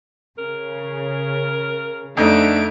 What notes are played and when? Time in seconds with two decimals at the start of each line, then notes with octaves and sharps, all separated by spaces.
0.38 C#3 A#4
2.17 F2 D3 A3 D#4 D7